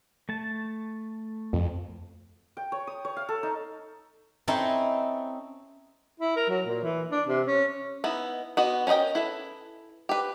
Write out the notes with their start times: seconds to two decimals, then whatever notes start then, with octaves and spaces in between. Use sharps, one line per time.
0.29 A3 A5
1.53 F2
2.57 G5
2.72 C#5
2.87 D#6
3.05 C#5
3.17 F5
3.29 A4
3.43 D#4
4.48 C4 C#4 D#4 E4 A4
6.20 E4
6.36 A#4
6.49 F#3
6.66 A#2
6.83 E3
7.11 D4
7.27 C3
7.46 C#4
8.04 B3 D#4 E4
8.57 B3 F#4 D#5
8.87 C#4 A#4 B4 D#5 G5
9.15 E4 A4 B4
10.09 G4 B4